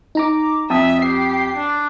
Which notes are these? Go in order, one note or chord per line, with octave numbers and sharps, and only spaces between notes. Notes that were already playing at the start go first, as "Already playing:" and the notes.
D#4 A#5 D6
F2 E5 A5 D#6 E6
G4 C7
D4